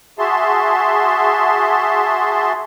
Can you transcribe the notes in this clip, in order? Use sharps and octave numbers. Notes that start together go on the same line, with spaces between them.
F#4 G#4 E5 A5 C6